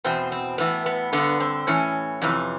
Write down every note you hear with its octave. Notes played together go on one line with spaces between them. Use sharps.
E2 B2 C4
C4
A2 E3 B3
B3
G2 D3 B3
C4
A2 E3 C#4
F2 C3 E3